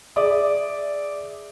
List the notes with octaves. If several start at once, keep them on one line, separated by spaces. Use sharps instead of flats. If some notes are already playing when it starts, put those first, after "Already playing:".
G#4 D5 E5 D6 D#6